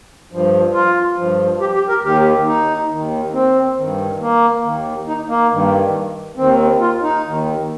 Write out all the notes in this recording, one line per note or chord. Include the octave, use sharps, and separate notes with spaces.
G2 F3
F4
G2 F3
G4
G4
A#4
D#2 D#3 G4
D#4
D#2 D#3
C4
G2 D#3
A#3
D#2 D#3
D#4
A#3
G2 D#3
D#2 D#3 C4
F4
D#4
D#2 D#3